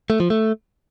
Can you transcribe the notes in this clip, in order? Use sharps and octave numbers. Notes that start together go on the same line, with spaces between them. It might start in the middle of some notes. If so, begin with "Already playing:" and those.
A3
F3
A3